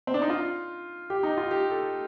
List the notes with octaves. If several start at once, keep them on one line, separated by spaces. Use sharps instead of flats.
C4
D4
D#4
F4
G4
D#4
F4
G4
A4